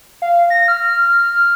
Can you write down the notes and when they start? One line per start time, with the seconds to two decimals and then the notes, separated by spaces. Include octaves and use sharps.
0.22 F5
0.50 A#6
0.68 F6